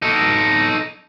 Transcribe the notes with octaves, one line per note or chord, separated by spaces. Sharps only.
D#4 A4